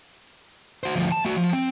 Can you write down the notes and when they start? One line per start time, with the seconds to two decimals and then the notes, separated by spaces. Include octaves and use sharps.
0.83 F#4 C5
0.96 D2 F3
1.12 A5
1.25 A3 F#4
1.37 F3
1.53 C4